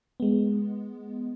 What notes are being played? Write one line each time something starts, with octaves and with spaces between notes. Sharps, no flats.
G#3 B3